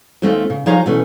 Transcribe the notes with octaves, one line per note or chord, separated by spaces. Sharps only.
D#2 G#3 A3 C4 F4
C#3
F3 D#4 G#4 C#5 F5 A#5
B2 E3 A3 C#4